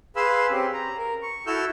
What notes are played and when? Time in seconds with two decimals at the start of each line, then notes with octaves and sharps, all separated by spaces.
0.16 G#4 B4 F5 B5 C6 E6
0.50 C4 C#4 G4
0.73 A#5
0.98 A#4
1.22 C#6
1.47 E4 F#4 A4 E6 F6 G6